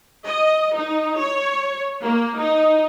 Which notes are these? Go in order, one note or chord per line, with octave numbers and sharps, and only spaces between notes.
D#5
D#4
C#5
A#3
D#4